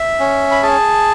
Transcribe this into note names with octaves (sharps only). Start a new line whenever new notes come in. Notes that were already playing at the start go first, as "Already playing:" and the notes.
Already playing: E5
C#4
B5
G#4 A5